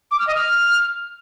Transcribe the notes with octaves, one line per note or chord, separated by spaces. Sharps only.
D6
F6
D#5
F6